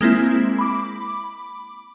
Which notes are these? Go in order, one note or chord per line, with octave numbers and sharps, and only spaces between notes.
G#3 A#3 C4 E4
B5 D6